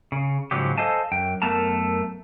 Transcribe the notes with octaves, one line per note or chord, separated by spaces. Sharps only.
C#3
G#2 C#3 F3 F#3 G4
A4 C5 D#5 F5 G#5 A5
F#2 G5
F#2 A3 B3 A#4 A5 A#5